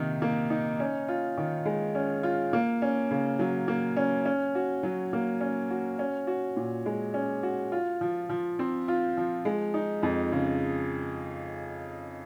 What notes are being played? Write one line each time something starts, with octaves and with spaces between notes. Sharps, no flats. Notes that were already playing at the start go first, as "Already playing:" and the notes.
Already playing: C3 D#3 A#3 D#4
A#3
D#4
C#4
F4
D#3
G#3
C#4
F4
A#3
C#4
C#3
F#3
A#3
C#4
C#4
F#4
F#3
A#3
C#4
F#4
C#4
F#4
A#2
G#3
C#4
F#4
F4
F3
F3
C4
F4
F3
G#3
D#4
F2
C#3